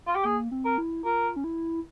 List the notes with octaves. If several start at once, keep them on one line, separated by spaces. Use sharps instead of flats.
F4
G4
A#3 G#4
C4
A#4
E4
F4 A#4
C#4
E4